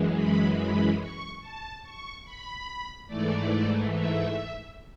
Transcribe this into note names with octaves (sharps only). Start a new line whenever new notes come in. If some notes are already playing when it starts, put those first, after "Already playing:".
Already playing: F#2 E3 G#3
B5
B5
C#6
A5
C#6
B5
G#2 E3 A3 D5
E5